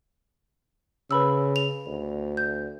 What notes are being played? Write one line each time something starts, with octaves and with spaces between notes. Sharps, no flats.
C#3 B4 B5 E6
F7
D2
G6